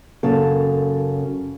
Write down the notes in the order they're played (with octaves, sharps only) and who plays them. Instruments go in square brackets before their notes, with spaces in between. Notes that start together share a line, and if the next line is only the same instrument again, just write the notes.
[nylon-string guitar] F#2 C#3 A#3 A4